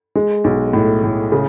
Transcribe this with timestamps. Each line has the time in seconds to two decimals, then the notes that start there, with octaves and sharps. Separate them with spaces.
0.15 G#3
0.44 B1
0.73 A2
1.04 A2
1.32 C#3